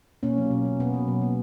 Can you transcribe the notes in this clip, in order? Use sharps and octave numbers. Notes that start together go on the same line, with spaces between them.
B2 A#3 C#4
F#3
B2
A#3
B2 B3
F#3
B2
A#3